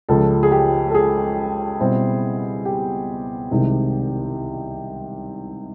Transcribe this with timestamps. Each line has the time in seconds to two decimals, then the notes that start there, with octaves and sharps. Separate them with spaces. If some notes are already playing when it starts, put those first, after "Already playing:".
0.09 C#2 C#3 F3 A4
0.43 G#4
0.52 G4
0.90 A4
0.95 G#4
1.80 B2 G3 C4 E4
2.65 G4
3.51 C2 C3 D#3 G#3